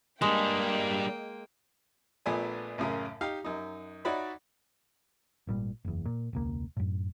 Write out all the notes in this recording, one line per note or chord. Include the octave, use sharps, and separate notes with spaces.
G3 G#3 A#3 D4 G5
A#1 A#2 A3 B3 D5 G#5
A1 F#2 C#3 A#4
D#4 G4 F5
F#2 D#4
D#4 F#4 C#5 D5 E5 B5
G#1 A#2 G3
F#1 E2
A#2
E1 C#2 A#3
F#2 A2